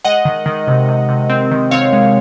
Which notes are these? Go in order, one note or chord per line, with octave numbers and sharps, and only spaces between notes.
G#3 D#5 F#5
D#3
D#3
C3
C3
C3
C4
D#3
C4 C#5 F5
G#3